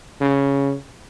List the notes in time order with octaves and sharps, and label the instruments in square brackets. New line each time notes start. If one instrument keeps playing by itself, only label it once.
[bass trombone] C#3